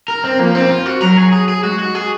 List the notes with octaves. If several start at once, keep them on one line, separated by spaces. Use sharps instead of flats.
A#4
C4
F3 A#3
C4
F4
F#4
F#3 A#4
G#4
G#4
G#4
G#3 F#4
F#4
G#4